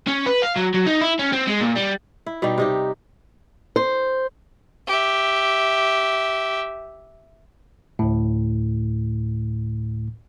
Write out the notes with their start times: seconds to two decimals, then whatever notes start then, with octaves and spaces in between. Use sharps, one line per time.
0.07 C#4
0.26 B4
0.42 F5
0.56 F#3
0.74 F#3
0.86 D#4
1.01 E4
1.19 C#4
1.32 C4
1.47 G#3
1.61 A#2
1.75 G3
2.26 E4
2.42 B2 G3 D#4 G4
2.58 C3 D#4 G4
3.76 C5
4.87 G4 E5
7.99 D2 A2